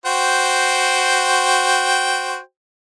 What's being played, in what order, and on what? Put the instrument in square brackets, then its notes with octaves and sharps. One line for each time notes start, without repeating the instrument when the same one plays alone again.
[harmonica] F#4 C5 G5